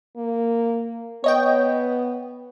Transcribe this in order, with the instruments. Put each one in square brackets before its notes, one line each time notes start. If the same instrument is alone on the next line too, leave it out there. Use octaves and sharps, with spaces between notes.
[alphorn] A#3
[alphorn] B3 [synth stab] C#5 D#5 G5